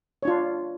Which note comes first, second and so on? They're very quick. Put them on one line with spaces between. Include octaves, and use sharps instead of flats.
C#5 D4 F4